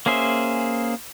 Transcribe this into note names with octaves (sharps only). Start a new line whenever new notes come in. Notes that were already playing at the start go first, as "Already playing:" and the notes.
A#3 C#4 G#4 C5 E5